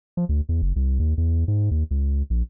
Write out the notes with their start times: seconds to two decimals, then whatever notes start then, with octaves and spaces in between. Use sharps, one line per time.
0.17 F3
0.29 D2
0.49 E2
0.62 F#1
0.76 C2
0.99 D#2
1.18 E2
1.48 G#2
1.71 D#2
1.91 C#2
2.30 A#1